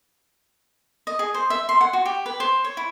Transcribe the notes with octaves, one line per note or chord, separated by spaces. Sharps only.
D#5
G#4
C5
E5
C6
F#5
F#4
G4
B4
C5
C#5
E4